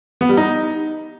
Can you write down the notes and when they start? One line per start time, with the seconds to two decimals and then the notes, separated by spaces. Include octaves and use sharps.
0.21 B3
0.29 G3
0.37 D#4